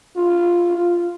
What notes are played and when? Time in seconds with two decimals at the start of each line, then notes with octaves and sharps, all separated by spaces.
0.16 F4
0.78 F4